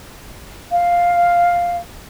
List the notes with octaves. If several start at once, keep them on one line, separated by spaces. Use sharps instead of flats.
F5